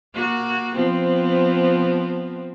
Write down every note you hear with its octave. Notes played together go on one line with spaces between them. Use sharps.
A#3 F#4
F3 B3 C4